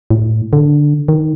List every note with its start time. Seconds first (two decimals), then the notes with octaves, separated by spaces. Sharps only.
0.10 A2
0.53 D3
1.08 D#3